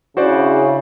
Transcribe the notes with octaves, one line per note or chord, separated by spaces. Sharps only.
C#3 D4 E4 F#4 C5 D5